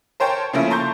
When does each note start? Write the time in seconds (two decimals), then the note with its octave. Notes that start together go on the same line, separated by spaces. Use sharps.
0.20 A#4 C5 C#5 G5 A5
0.53 C#3 F3 A3 A#3 C#4 E4
0.70 A5 A#5 C6 C#6 G6